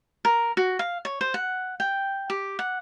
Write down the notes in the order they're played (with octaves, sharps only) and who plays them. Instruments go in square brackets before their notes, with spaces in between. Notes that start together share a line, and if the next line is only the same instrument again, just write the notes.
[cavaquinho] A#4
F#4
F5
C#5
C5
F#5
G5
G4
F#5